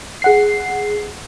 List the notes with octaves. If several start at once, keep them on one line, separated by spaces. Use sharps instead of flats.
G#4 F#5 C7